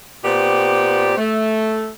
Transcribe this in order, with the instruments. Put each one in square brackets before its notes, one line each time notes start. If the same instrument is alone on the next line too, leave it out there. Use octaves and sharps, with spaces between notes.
[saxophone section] A#2 B3 C4 G4 D5
A3